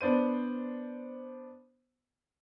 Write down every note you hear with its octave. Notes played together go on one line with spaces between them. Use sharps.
B3 D4 C5 D#7